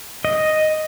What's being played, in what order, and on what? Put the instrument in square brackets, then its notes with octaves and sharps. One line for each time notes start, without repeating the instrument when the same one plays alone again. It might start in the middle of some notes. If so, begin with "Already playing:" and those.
[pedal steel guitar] D#5